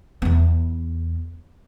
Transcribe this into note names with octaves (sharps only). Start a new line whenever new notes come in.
E2 B3